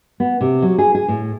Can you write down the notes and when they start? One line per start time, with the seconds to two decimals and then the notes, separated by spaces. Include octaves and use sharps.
0.20 B3
0.41 C3
0.62 F#3
0.78 G#4
0.95 G#4
1.08 A2